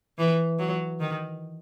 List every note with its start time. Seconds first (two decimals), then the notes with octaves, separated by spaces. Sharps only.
0.18 E3
0.59 F#3
1.00 D#3